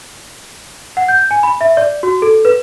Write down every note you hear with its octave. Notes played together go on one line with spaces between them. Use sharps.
F#5
G6
G#5
B5
E5
D5
F#4
A4
B4